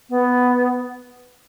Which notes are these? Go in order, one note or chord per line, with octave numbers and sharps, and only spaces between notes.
B3